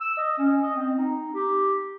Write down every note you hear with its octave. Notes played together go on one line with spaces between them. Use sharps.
E6
D#5
C#4
D#5
C4
D#4
G4